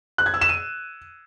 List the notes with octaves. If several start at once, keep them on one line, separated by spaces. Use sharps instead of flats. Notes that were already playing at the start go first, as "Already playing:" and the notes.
F#6
G#6
E6
E7
D#7